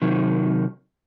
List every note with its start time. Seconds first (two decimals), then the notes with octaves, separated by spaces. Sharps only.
0.02 C3 D#3 F#3